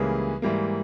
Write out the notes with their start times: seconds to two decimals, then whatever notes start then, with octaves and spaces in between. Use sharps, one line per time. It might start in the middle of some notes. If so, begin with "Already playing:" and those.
Already playing: C#2 C#3 E3 G3 A#3 G#4 B4
0.42 G#2 E3 G3 A#3